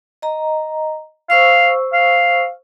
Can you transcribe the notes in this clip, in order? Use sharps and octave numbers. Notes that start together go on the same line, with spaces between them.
D#5 A#5
C5 F5 C#6 E6
F5